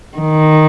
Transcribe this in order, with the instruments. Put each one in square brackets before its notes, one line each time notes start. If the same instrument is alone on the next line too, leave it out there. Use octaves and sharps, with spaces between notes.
[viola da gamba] D#3